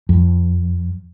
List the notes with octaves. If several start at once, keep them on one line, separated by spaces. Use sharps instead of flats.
F2